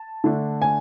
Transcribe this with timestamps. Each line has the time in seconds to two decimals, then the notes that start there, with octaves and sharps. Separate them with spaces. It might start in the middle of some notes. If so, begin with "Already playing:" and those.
Already playing: A5
0.24 D3 A3 D4
0.62 G#5